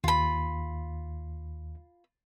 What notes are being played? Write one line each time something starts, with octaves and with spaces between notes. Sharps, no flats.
D#2 F4 B5